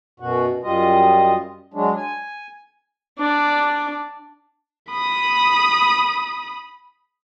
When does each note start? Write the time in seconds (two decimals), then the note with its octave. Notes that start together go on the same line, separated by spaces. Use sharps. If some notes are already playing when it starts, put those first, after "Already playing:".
0.20 F#2 B2 F#4
0.64 F#2 G3 F4 D#5
1.74 F#3 G#3 D4
1.97 G#5
3.19 D4 D5
4.91 B5 D#6